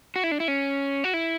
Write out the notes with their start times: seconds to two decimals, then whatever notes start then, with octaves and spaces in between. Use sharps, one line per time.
0.16 F#4
0.24 E4
0.31 D4
0.40 E4
0.48 C#4
1.04 F#4
1.14 E4